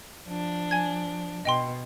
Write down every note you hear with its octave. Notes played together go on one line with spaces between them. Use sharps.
F3 D4
G#5 G#6
B2 D#5 G5 C6